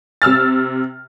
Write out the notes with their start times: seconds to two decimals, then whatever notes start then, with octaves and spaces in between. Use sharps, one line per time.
0.22 C3 E6 F6 A6